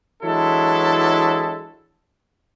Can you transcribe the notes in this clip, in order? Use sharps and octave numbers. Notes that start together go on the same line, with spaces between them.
E3 F#3 G#3 D4 E4 A4